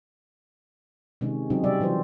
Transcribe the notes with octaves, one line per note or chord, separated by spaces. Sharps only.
C3 D#3 G#3 C#4
C#3 F#3 C4 C#4 D#4
C3 G3 D5 E5
C#3 E3 F#3 F4 C5